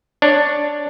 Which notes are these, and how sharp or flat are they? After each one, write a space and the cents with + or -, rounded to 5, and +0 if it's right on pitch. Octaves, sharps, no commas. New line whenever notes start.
D4 +0 C#5 +0